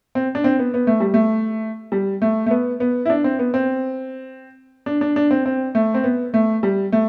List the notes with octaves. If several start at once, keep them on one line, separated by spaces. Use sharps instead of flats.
C4
D4
C4
B3
B3
A3
G3
A3
G3
A3
A3
B3
B3
E4
D4
C4
B3
C4
D4
D4
D4
C4
C4
A3
C4
B3
A3
G3
A3